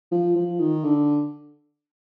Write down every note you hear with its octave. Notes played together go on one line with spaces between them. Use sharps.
F3
F3
D#3
D3